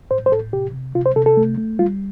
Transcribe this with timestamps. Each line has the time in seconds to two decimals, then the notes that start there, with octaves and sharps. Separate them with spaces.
0.11 A2 C5
0.26 C5
0.32 A2 A4
0.53 C3 G4
0.74 C3
0.95 C3 F4
1.06 C5
1.16 C3 A4
1.26 A4
1.37 A3
1.58 A3
1.79 G3 F4